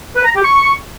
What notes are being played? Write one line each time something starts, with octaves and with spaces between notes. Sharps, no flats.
B4
A#5
G4
C#6